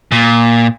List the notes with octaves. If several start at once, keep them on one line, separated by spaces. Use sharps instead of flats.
A#2